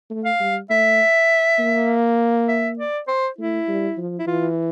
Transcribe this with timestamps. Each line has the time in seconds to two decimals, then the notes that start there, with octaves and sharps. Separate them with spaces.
0.10 A3
0.25 F5
0.40 G3
0.69 A3 E5
1.59 A#3
2.48 E5
2.79 D5
3.08 C5
3.38 A3 E4
3.68 G3
3.97 F3
4.19 E4
4.27 E3 F4